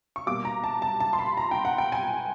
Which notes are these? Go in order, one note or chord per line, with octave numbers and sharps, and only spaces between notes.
C#6
B2 G3 A#3 D6
A#5
A5
A5
A5
C6
B5
A#5
G5
F#5
G5
G#5